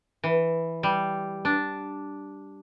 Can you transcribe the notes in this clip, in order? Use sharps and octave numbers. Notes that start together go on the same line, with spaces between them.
E3
G3
D4